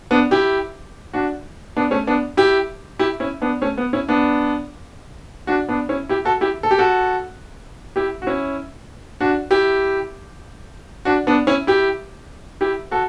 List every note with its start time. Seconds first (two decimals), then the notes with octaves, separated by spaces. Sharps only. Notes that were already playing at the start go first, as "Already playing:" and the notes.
0.11 B3 D4
0.31 E4 G4
1.13 D4 F#4
1.77 B3 D4
1.91 A3 C#4
2.07 B3 D4
2.37 E4 G4
2.99 E4 G4
3.20 C#4 E4
3.42 B3 D4
3.61 A3 C#4
3.78 B3
3.93 C#4 E4
4.09 B3 D4
5.47 D4 F#4
5.69 B3 D4
5.89 C#4 E4
6.09 E4 G4
6.25 F#4 A4
6.41 E4 G4
6.63 A4
6.71 G4
6.78 F#4 A4
7.96 E4 G4
8.22 F#4
8.27 C#4 E4
9.20 D4 F#4
9.51 E4 G4
11.05 D4 F#4
11.27 B3 D4
11.47 C#4 E4
11.67 E4 G4
12.61 E4 G4
12.91 F#4 A4